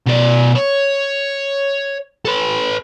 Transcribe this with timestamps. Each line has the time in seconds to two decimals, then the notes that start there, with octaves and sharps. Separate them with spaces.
0.06 B2 D5
0.55 C#5
2.25 A4 B4